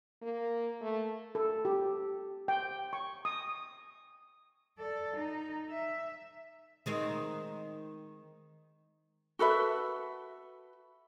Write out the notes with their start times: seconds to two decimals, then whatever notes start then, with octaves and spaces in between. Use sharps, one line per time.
0.23 A#3
0.81 A3
1.35 A4
1.65 G4
2.48 G5
2.93 C#6
3.25 D#6
4.79 A4 D5
5.16 D#4
5.70 E5
6.86 D#3 G#3 C4
9.39 F#4 A4 B4 E5